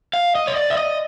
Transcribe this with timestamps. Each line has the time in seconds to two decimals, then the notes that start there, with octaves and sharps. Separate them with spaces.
0.13 F5
0.35 D#5
0.47 C#5
0.55 D5
0.70 E5
0.77 D#5